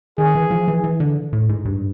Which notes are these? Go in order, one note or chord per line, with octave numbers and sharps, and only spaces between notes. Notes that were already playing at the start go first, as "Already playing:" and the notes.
D#3 G#4
E3
F3
E3
E3
D3
A2
G#2
G2